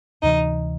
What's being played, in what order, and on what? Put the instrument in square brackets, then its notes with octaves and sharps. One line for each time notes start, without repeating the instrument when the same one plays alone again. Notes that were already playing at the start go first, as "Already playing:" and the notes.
[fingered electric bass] D2 C3 E3 [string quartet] D#4